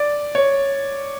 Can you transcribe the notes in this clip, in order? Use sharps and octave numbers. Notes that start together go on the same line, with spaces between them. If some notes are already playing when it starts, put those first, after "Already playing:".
Already playing: D5
C#5